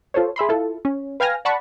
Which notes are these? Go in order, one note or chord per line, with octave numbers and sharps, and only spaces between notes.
F4 A4 C5 C#5
G#4 E5 B5 C6
E4 F4 A4
C#4
B4 F5 G5 G#5 F6 A#6
D5 F#5 A5 B5 C#6